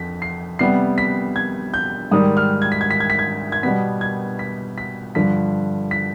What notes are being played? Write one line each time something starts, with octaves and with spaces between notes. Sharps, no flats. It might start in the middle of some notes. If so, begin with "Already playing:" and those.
Already playing: F2 B6
C7
C3 G3 B3 C7
B6
G#6
G6
G#2 D#3 G3 D#6
F6
G#6
B6
G#6
B6
G#6
B6
G#6
G#6
B2 G3 B3 B6
G#6
B6
B6
G2 D3 F3 B6
B6